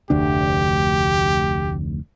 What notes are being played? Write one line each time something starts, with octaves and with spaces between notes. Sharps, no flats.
F1 D2 D4 G4